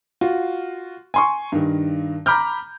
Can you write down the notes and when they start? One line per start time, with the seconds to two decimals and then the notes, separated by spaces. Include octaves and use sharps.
0.21 F4 F#4
1.14 G#5 C6 C#6
1.52 G2 D#3
2.26 A#5 B5 D6 F6 G6